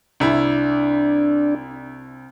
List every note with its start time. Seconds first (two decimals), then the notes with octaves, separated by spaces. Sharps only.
0.20 C2 D4 E4